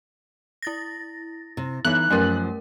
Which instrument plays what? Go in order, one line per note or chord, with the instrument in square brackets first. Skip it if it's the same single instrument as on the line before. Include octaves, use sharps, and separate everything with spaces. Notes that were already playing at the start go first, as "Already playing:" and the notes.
[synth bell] E4 A6 A#6
[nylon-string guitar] C3
[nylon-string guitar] E3 E5 [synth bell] B3 D#4 [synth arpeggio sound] F#6
[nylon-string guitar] F#2 F3 [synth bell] A3 C#4 A#4